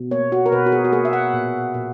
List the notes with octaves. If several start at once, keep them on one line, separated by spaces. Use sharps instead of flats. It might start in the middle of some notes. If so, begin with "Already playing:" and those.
Already playing: B2
A#3 C#5
F#4
A#4
B2 B4
F#4
G#4
F#4
A#3 G#4
E5
F#5
A#2
A#2